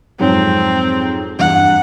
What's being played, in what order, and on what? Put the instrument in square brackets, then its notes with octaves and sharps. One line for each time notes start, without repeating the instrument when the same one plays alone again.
[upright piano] F2 G#2 F#3 [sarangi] C4
[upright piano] E2 G2 [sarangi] F#5